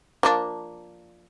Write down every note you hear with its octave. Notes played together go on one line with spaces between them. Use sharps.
F3 A#3 D4